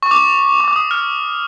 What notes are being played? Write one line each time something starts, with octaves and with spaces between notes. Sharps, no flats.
C#6
D6
C#6
D6
D#6
F6